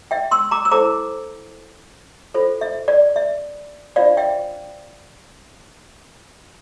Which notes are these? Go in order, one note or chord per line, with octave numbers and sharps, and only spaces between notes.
E5 G5
C6 E6
A#5 D6
E6
E4 A4 C5 A#5 D6
F4 A4 C5
E5
D5
E5
D4 F4 C5 D5 F5
E5 G5